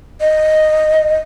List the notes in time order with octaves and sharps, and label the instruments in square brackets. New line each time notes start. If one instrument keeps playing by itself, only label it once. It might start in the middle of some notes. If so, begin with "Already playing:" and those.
[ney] D#5